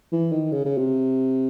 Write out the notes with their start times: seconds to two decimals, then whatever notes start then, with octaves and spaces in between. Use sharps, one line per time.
0.12 E3
0.32 D#3
0.52 C#3
0.65 C#3
0.78 C3